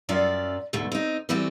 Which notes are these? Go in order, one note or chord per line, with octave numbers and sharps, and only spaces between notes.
F#2 F#3 C#4 F4 D5 E5
D2 G#2 B2 A3
C4 D#4
E3 G3 A3 C4 F#4 G4